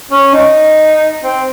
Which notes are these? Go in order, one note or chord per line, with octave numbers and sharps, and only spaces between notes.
C#4
D#4
C4